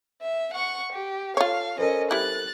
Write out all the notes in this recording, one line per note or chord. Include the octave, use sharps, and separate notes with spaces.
E5
F#5 C#6
G4
F4 A4 C#5 F5
C#4 A4 A#4 C5 D#5
G3 E4 F#6 A6